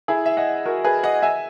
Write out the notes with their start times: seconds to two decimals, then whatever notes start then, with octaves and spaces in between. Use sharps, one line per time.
0.08 E4 G#4
0.26 E5
0.37 D#5 F#5
0.65 F#4 A#4
0.84 G#4 B4
1.03 D#5 F#5
1.22 E5 G#5